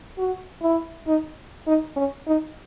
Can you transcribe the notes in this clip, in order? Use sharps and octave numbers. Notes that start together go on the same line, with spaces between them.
F#4
E4
D#4
D#4
C#4
D#4